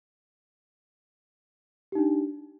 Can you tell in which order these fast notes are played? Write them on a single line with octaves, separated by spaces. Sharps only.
G4 D#4 D4